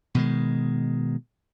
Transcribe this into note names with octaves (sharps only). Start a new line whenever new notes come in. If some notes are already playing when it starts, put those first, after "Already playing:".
B2 D#3 G#3